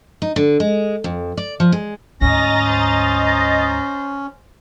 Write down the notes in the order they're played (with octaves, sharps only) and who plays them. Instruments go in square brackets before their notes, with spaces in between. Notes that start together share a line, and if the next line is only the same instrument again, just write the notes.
[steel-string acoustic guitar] D#4
D3
G#3
F2
D5
F3
G#3
[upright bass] D2 G#2 [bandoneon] C#4 [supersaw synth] D#5 A#5 A6 [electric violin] A#6
[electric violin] C5